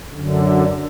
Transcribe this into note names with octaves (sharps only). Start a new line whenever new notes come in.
F#2 D3